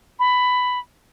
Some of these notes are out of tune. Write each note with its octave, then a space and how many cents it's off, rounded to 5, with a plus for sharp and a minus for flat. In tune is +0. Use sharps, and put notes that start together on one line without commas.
B5 +10